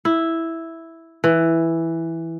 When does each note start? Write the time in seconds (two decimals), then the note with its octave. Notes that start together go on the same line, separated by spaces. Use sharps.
0.05 E4
1.24 E3